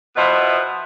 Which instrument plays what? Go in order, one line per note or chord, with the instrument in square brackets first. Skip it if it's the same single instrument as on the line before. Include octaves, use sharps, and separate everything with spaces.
[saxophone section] B2 F3 B3 E4 D#5 E5